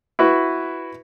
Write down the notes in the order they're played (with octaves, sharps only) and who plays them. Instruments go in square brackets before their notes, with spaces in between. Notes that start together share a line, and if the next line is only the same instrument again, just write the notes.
[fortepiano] E4 F#4 B4